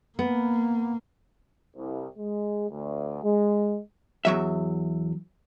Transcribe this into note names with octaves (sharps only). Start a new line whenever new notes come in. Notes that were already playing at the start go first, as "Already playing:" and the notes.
A#3 B3
C2
G#3
D2
G#3
E2 F#3 E5